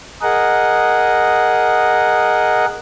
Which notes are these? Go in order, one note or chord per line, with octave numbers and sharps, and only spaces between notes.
G#4 A#4 D#5 F#5